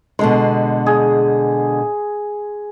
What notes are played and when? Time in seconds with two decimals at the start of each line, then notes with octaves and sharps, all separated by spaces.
0.19 B2 D3 G#3 C6
0.86 G#4